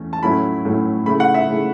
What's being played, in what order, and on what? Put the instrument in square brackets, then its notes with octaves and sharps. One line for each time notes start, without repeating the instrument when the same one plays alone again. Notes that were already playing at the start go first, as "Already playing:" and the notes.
Already playing: [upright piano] E2 A3 C#4
A5
A2 F#3 A3 C#4 E4 B5
A2 F#3 A3 C#4 E4
C#3 A3 E4 B5
F#5
E5
C#3 A3 E4